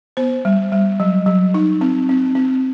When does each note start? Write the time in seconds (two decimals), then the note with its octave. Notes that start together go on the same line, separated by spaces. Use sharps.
0.17 B3 C5
0.45 G3
0.72 G3
1.00 F#3
1.26 F#3
1.54 D#4
1.81 C4
2.09 C4
2.35 C4